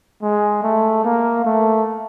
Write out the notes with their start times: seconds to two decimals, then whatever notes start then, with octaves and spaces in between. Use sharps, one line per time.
0.22 G#3
0.63 A3
1.04 A#3
1.45 A3